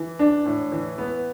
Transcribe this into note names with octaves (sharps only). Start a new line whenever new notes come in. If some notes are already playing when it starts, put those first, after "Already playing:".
Already playing: E3
D4
A2
E3
B3